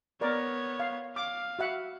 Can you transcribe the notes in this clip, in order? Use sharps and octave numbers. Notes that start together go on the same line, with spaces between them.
B3 A#4 C#5 D5
F5
F5 D6
F#4 E5 F#5